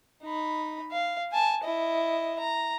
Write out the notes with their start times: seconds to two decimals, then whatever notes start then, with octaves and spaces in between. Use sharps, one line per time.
0.23 D#4 B5
0.92 F5
1.31 G#5 A5
1.63 E4 D#5
2.40 A#5